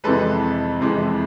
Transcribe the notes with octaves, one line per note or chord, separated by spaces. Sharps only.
F2 C3 E3 G#3 A4 B4
F2 C3 E3 G#3